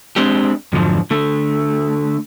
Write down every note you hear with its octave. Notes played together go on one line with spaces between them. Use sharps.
G#3 C4 D4 G4
F2 G#2 D3 F3 F#3
D3 A3